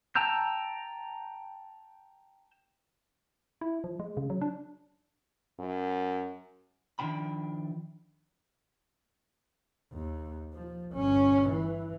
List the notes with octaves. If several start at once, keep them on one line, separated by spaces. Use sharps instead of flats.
G5 A5 A#5 E6 G6
E4
F3
G#3
C#3
F#3
D4
F#2
D#3 F3 D4 G5 B5
D#2
F3
G1 C#4
E3